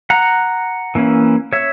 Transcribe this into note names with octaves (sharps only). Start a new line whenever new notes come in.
F#5 A#5
E3 A#3 C#4 E4
C#5 E5